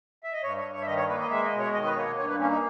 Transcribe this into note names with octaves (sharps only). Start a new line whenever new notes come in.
E5
D#5
G2 C#5
C#5
G2
C#5
E5
D#3 D#5
C#5
A#3 B4
D#5
G#3 E5
D#5
B2
C#5
D#3 D#5
B4
A#3 C#5
G2 C#5
B4
A#3 C#4
D#4